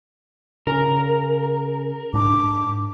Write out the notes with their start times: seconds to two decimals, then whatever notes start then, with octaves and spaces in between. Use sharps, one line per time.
0.67 C#3 A#4
2.13 G#2 D4 D6